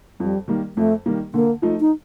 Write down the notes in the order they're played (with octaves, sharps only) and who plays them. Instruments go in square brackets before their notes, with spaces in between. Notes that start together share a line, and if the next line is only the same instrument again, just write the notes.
[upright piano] F2 [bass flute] G3
[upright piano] D#3 G3 A#3
[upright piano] F2 [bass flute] A3
[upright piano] D#3 G3 A#3
[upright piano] D3 [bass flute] A#3
[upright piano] F3 A3 D#4
[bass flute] D#4